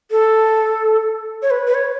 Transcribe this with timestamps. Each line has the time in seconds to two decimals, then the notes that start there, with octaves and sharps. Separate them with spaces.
0.11 A4
1.42 C#5
1.51 B4
1.67 B4
1.74 C#5